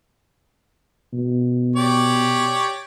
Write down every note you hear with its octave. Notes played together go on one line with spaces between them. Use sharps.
B2
G4 C#5 D5